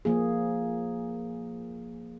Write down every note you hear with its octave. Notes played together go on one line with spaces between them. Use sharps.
F3 A#3 G#4